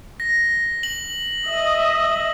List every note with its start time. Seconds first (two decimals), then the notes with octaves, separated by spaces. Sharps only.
0.20 A#6
0.83 F#7
1.48 D#5 E5